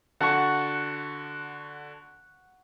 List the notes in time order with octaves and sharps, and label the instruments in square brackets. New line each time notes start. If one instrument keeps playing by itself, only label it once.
[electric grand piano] D3 F#4 A5 [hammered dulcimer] F#5 C#6